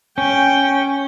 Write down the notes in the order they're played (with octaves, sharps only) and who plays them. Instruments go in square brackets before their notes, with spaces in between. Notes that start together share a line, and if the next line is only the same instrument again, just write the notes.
[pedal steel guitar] C#4 [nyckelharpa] G5